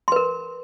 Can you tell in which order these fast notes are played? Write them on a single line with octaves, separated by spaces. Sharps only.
C6 B4 A#4